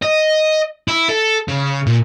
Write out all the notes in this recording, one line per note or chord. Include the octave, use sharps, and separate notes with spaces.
D#5
E4
A4
C#3
A#2